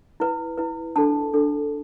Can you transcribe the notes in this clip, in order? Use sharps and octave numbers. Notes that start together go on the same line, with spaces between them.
E4 B4
E4 B4
D4 A4 A5
D4 A4